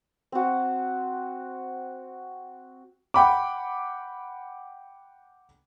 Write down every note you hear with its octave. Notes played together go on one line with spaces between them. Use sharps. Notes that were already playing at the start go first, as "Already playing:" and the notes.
C4 F#4
F#5 G5 B5 D6